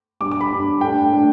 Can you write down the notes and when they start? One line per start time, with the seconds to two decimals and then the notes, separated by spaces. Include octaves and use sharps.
0.20 G2 G3 D4 D6
0.32 D6
0.41 B5
0.51 G2 G3 D4
0.81 A2 A3 D4 G5
1.12 A2 A3 D4